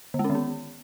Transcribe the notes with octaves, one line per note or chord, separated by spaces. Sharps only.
D3
G#3
C#4
D#3
B3